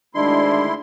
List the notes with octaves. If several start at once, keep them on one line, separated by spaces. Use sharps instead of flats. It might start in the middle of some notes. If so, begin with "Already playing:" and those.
D2 D#3 G#3 D4 E4 C6